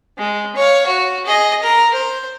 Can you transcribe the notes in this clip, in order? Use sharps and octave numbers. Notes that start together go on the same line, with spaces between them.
G#3
C#5 F5
F#4
G#4 D#5
A#4
C5